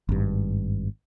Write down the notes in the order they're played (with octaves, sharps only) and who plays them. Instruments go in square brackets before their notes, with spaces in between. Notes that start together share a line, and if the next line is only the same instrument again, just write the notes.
[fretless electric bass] G#1 G2